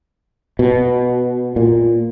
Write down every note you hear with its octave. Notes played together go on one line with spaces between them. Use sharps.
B2
A#2